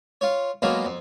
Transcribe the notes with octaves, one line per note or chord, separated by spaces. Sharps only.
F4 C#5
F#3 G#3 A#3 B3 C#4 F4
F2